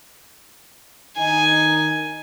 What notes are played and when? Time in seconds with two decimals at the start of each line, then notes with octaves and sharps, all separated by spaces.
1.18 D#3 D#4 G#5